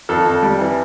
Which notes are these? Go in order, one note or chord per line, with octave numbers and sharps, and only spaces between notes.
F2 A4
F2
G3
E3